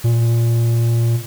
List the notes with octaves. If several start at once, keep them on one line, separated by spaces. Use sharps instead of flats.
A#2